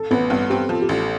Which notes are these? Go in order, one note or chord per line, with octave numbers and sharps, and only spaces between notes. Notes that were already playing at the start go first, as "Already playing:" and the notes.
Already playing: A4
A1 B3 B4
G2 B3 B4
C4 G4
F3 A4
G4
A1 A4